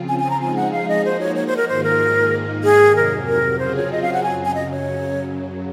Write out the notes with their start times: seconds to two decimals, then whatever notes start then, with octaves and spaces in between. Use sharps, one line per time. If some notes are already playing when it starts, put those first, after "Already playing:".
Already playing: C#3 F3 C4 F4
0.08 G#5
0.19 G#5
0.30 A#5
0.40 F3 G#3 D#4 G#4 G#5
0.56 F#5
0.72 F5
0.88 D#5
1.03 F3 A#3 D#4 F#4 C5
1.20 C#5
1.35 C#5
1.47 C5
1.57 A#4
1.68 G#2 D#3 A#3 F4 G#4 C5
1.84 A#4
2.31 G#2 D#3 A#3 D#4
2.63 G#4
2.95 F2 C3 F#3 A#4
3.28 A#4
3.59 C#3 F#3 C4 F4 G#4 C5
3.76 C#5
3.92 D#5
4.02 F5
4.13 F#5
4.23 F#2 C#3 F#3 G#5
4.45 G#5
4.55 D#5
4.71 C#5